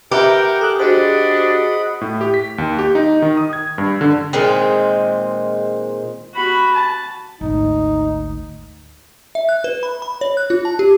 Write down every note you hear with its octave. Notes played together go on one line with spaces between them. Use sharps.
G4 A#4 B4 E5 F#5 G5 A#5
G#4 A4 F#6
D4 F#4 G#4 C5 D#5 F#5 B5
A2
G4
B6
D#2
G4
D#4
D#3
D#6
G#6
G2
D3
A#2 D#3 G#3 C4
F#4 B5
A5
G#1 D2 D#4
E5
F#6
B4
B5
B5
C#5
F#6
F4
A5
G4